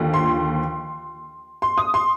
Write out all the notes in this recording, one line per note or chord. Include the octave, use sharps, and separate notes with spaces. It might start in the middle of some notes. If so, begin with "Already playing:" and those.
Already playing: D#2 D3 F3
C6
C6
D#6
C6